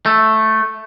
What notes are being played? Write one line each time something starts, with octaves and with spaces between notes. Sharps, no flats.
A3